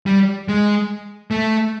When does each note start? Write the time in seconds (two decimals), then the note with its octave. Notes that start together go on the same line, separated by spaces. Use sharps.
0.06 G3
0.49 G#3
1.31 A3